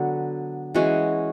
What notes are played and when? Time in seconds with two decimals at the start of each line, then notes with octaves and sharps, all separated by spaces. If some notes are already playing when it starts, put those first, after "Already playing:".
Already playing: D3 F#3 B3
0.74 E3 G#3 C#4 F#4